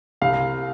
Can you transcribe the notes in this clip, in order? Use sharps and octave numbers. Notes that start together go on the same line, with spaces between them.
C2 F5